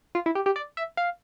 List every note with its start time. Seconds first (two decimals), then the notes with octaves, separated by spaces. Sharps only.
0.15 F4
0.26 E4
0.35 G4
0.46 G4
0.56 D5
0.77 E5
0.97 F5